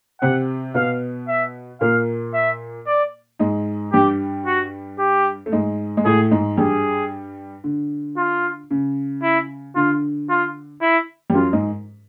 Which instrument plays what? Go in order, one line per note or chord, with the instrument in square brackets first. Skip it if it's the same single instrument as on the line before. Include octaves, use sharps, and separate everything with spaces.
[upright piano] C3 C4 [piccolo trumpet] F#5
[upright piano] B2 B3 [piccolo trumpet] F5
[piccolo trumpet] E5
[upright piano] A#2 A#3 [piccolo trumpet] F5
[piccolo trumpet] E5
D5
[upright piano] G#2 G#3
[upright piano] G2 G3 [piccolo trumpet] G4
[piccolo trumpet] F#4
G4
[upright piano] A3
G#2 G#3
G#3
[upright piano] A2 A3 [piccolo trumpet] G#4
[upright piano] G#2 G#3
[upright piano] G2 G3 [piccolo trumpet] G#4
[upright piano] D3
[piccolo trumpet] F4
[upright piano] C#3
[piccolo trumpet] E4
[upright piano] D3 [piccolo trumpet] F4
[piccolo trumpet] F4
E4
[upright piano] G3
[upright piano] F#2 F#3 [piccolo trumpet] F4
[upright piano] G#2 G#3